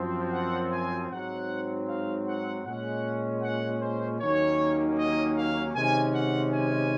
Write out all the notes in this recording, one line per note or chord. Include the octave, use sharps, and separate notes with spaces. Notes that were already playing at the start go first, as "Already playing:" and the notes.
Already playing: F#2 F3 C4
F#5
G#5
G#2 F#3 C4 F#5
F5
F#5
A#2 G#3 C#4 F#5
F#5
C5
D#2 D#3 F#3 A#3 C#4 C#5
D#5
F5
C3 D#3 G#3 C#4 G#5
F#5
G#5